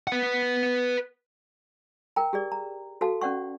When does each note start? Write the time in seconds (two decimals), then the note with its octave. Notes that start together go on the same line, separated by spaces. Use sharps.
0.07 B4 F#5
2.16 A#4 G5 A#5
2.33 G4 G#4 D5
2.52 A#5
3.01 F#4 A4 B4 F5 A5
3.21 C#4 B4 D5 F#5 C#6